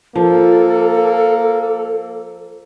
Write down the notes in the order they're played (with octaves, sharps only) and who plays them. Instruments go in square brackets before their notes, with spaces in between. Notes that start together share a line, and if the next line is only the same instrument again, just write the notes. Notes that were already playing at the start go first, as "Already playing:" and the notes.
[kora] F3 [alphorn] A#3 [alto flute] A4